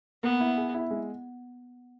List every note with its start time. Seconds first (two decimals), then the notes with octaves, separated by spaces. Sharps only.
0.23 A#3 B3
0.40 E4
0.57 G#4
0.74 E4
0.91 G#3